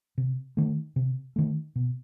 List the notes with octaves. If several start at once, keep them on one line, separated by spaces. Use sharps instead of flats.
C3
D#3 A3
C3
D#3 A3
B2